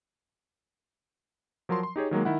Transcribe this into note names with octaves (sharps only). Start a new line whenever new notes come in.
F3 F#3 A#4 A5 C6
C6
D#4 G4 G#4 C#5
D#3 F#3 G#3 A#3
D#3 E4 F#5